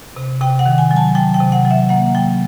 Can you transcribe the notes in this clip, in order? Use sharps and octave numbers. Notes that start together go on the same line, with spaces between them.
C3
C3 G5
F#5
D#3
G#5
F#3
A5
F#3 G5
G5
C3
F#5
F#3
E5
A#3 F#5
F#3 G5